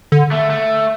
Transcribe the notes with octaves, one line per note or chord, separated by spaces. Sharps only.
D3
A3
A3